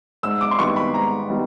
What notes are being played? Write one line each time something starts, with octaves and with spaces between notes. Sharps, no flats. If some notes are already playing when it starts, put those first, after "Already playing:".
G#2 E6
D6
C6
D#3 G3 B3 E4 C#6
B5
G#2 A#5
D#3 G3 B3 E4